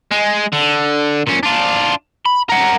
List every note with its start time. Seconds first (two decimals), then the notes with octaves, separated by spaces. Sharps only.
0.11 G#3
0.53 D3
1.27 A#2 C#4
1.43 D4 F4
2.26 B5
2.49 A#4 F#5